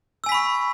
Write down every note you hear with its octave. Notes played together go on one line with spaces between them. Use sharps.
G#5 B5 C#6 E6 B6